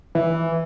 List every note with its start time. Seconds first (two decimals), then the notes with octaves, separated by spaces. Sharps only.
0.15 E3